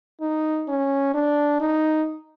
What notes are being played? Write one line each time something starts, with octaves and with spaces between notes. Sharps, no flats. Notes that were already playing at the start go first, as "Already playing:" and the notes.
D#4
C#4
D4
D#4